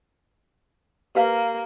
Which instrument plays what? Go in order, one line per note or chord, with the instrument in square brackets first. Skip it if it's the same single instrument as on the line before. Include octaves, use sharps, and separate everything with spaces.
[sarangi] A#3 [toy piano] G4 B4 F5